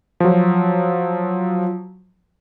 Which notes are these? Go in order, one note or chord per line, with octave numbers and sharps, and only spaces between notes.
F3 F#3